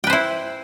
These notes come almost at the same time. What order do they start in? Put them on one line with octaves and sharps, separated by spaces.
G5 B4 C5 E4